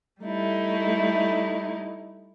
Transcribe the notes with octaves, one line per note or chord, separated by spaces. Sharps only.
G3 A3 D#4 E4